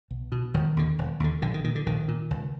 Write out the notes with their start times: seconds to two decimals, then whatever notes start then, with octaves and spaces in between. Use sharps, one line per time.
0.11 B1
0.32 B2
0.54 E1 D#3
0.77 D#2 D3
0.99 E1
1.20 D#2 D3
1.42 A#1 D3
1.54 D#3
1.64 A#2 D#3
1.75 D3
1.86 A#1 D#3
2.08 A#2
2.31 C#2